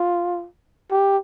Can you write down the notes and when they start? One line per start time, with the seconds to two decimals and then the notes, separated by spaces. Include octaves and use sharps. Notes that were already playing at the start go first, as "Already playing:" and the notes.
Already playing: F4
0.91 G4